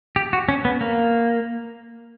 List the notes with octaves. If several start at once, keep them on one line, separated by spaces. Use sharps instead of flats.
G4
F#4
C#4
B3
A#3